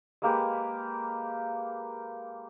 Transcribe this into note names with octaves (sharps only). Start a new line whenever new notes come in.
G#3 A#3 G4 B4